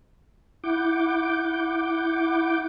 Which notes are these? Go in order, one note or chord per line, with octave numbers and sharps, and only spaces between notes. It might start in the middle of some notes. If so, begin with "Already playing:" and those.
E4 F#5 D6 G6